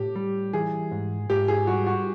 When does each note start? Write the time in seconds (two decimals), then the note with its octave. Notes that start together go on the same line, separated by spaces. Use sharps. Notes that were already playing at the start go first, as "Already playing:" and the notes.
Already playing: A2 G4
0.16 G3
0.53 E3 G#4
0.91 G#2
1.30 G#2 G4
1.48 G#4
1.67 G3 F#4
1.87 F#4